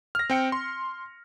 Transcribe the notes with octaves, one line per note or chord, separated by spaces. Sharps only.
F6 A#6
C4 G5 C#7
C6